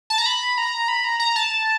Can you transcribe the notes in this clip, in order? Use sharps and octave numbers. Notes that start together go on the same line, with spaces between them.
A5
A#5
B5
A#5
B5
A#5
A#5
A5